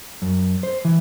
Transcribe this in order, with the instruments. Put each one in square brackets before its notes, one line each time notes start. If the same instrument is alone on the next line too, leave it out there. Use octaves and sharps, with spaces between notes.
[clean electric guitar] F#2
C5
E3